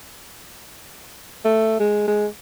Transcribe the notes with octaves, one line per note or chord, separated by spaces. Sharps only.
A3
G#3
G#3